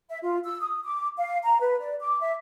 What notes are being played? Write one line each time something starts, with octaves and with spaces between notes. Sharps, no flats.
E5
F4
E6
D#6
D6
F5
A#5
B4
D5
D6
E5